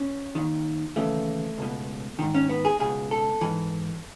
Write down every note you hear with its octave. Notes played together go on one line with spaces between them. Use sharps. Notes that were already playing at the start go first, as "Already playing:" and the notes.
Already playing: C#4
D#2 D#3
D#2 C#3 E3 A3
C#2 B2
G#2 D#3
C#4
B3
G#4
C#2 B2 G#4
A4
G#2 E3